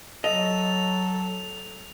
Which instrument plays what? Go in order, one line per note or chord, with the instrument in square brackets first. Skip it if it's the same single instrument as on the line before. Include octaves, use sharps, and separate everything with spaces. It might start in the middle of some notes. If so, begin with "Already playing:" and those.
[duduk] F#3 [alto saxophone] A4 [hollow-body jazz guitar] D#5 [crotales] F7